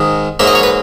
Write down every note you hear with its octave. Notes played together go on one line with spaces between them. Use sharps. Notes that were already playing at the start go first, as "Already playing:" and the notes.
Already playing: G#2 D#3 G#3
G#2 F#3 A#3 E5
D#5
C#5
B4